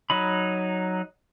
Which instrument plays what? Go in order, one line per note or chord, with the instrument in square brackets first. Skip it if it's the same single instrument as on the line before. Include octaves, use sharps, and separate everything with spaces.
[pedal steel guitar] F#3 D#4 B5